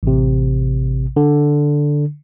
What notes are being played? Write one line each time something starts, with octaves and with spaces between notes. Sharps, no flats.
A1 C3
D3